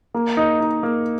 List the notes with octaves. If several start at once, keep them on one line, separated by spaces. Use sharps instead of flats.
A#3
D#4
D#4
A#3